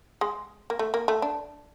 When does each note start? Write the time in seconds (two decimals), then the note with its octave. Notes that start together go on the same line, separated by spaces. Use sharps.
0.21 G#3
0.70 A#3
0.79 A3
0.94 A#3
1.08 A3
1.22 D4